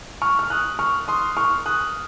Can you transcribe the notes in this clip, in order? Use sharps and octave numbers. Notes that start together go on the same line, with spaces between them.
C#6 F6
F6
D#6 F#6
C#6 F6
C6 D#6
C#6 F6
D#6 F#6